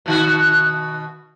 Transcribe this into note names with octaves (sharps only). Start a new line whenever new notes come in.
B2 D#3 F#4